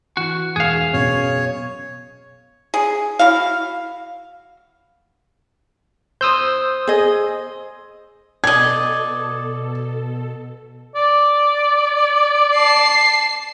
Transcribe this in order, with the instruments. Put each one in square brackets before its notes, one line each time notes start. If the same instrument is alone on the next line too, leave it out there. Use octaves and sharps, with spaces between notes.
[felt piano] E3 [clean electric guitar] F#4
[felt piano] E1 E7 [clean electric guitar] G#4 F5
[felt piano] F#2 B2 [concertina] C#5
[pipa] G#4
E4 F#4 F5
[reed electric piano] C5 C6 [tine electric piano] D#6 E6 G6
[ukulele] G#4 D#5
[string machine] B2 A4 [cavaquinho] D5 D#5 [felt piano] G#6
[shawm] D5
[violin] A5 C7